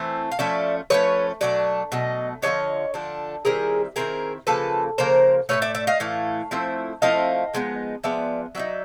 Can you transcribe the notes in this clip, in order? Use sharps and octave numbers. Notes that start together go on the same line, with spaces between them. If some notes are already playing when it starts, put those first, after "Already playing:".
Already playing: E3 A3 C4
F5
F3 A3 C#4 D5 E5
F3 A3 C#4 B4 C#5
B2 F#3 A3 D4 D5
B2 F#3 A3 D#5
D3 F3 A3 D4 C#5 D#5
D3 F3 A3 D4
D#3 G3 C4 E4 G#4 A#4
D#3 G3 C4 E4 G#4 A#4
C#3 F3 A#3 A4 B4
C#3 F3 A#3 A#4 C5
A2 E3 A3 B4 C#5
D5 E5
D5 E5
D#5 F5
A2 E3 A3
F3 A3 C4 E4
F3 A3 C4 E4 D#5 F5
F3 G#3 B3 D#4
F3 G#3 B3 D5 E5
F#3 B3 D#4 D5 E5